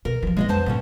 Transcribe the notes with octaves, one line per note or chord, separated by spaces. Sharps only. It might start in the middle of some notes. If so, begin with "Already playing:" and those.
B2 A#4
E3 F3
A#1 G#3 D5 D#5
F2 B3 C5 A5
D2 G2 A#2 C#4